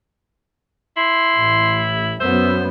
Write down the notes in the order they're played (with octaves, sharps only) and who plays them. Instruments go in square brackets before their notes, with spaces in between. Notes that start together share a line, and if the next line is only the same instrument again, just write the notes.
[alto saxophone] E4 [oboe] C6
[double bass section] A1
[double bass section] F#2 B3 [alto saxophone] C5 [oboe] E5